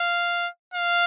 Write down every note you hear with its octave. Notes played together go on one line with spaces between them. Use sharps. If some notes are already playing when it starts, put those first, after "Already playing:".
Already playing: F5
F5